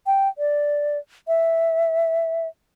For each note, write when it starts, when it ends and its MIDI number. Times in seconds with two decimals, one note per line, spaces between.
0.06 0.28 79
0.38 0.98 74
1.28 2.48 76